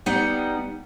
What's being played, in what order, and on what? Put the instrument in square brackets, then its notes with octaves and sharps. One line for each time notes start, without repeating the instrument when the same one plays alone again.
[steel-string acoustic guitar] G3 B3 D#4 D5 F#5